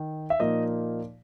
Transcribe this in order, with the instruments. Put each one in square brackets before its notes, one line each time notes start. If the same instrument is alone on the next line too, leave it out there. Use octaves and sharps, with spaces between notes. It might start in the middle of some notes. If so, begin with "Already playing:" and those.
Already playing: [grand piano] D#3
E5
A#2 F3 A#3 D#4 D#5